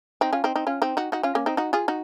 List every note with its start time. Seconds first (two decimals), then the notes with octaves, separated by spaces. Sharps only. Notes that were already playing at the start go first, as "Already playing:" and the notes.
0.21 C4 D#4
0.33 C#4 F4
0.44 C4 D#4
0.56 C4 D#4
0.67 C#4 F4
0.82 C4 D#4
0.97 D#4 F#4
1.12 D#4 F#4
1.23 C#4 F4
1.35 A#3 C#4
1.46 C4 D#4
1.57 D#4 F#4
1.73 F4 G#4
1.88 D#4 F#4